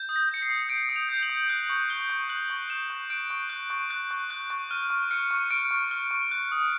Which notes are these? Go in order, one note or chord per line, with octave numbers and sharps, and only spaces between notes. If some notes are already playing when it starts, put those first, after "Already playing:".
Already playing: G6
D#6
A#6
G6 C#7
C7
D#6
G6 D7
D#6
F7
G6
F#7
D#6
F#6 F#7
C#6
F#6 G7
C#6
F#6 F#7
C#6
F#6 E7
C#6
F#6 D7
C#6
F#6
C#6
F#6
C#6
F#6
C#6
F6 D#7
C#6
F6 C#7
C#6
F6 D7
C#6
F6
C#6
F#6
D#6